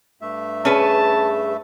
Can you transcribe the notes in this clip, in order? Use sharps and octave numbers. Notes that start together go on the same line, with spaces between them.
G2 A3 E5
C#4 G#4 B4 A5